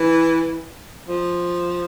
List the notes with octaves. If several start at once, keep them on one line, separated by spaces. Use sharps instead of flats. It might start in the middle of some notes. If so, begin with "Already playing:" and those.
Already playing: E3
F3